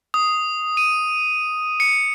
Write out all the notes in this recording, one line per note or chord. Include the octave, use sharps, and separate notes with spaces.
D#6
D#7
C#7